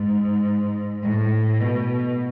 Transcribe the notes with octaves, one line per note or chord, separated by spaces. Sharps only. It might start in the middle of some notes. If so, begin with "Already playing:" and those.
Already playing: G#2
A2
B2